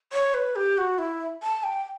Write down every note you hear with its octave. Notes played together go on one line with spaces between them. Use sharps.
C#5
B4
G4
F#4
E4
A5
G5